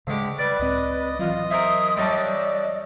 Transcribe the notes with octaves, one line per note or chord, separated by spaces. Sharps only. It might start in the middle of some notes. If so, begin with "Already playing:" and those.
D2 C#3 G#3 G4
G3 B4 D5
C#2 A2 C4 D#5
E3 F#3 F4 D#5
A#4 C5 E5 D#6
G3 C#4 D4 D#5 E5